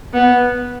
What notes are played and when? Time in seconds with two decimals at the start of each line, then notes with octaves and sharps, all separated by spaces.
0.14 B3